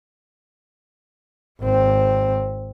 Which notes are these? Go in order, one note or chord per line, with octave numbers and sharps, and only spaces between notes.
G#1 C4